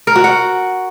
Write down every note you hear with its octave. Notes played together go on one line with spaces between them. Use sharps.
A#4
F#4
F#5